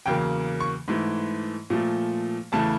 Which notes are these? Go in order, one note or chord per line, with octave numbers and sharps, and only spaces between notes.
E2 C#3 F#3 A#3 G5
C#6
G#2 E3 A3
A#2 F3 A3
E2 C#3 E3 A3 A5